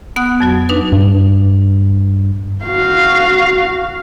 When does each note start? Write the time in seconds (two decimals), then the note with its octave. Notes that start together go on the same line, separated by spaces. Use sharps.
0.16 B3 F#5 D#6 F#6
0.40 F2 F#3 F#4
0.69 D4 D#4 B4
0.92 G2
2.65 F#4 F5